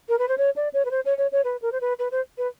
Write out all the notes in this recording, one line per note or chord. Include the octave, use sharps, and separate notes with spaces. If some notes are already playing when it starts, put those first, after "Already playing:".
A#4
B4
C5
C#5
D5
C#5
B4
C5
C#5
C#5
C#5
B4
A#4
C5
B4
B4
C5
B4